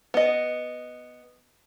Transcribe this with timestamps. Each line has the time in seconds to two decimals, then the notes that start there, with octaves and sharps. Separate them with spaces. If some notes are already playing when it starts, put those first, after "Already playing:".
0.14 B3 D#5